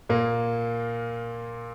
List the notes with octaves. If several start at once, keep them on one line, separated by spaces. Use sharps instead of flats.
A#2 A#3